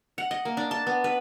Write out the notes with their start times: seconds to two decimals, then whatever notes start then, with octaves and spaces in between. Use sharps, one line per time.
0.18 F#5
0.31 D#5
0.45 A#3
0.57 D4
0.71 A5
0.87 B3
1.04 B4